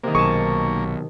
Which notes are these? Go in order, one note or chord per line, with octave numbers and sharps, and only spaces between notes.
C3 D#3 A#3
B1 G#4 A5 C#6